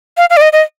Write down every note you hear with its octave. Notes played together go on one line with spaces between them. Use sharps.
F5
F5
D5
D#5
D#5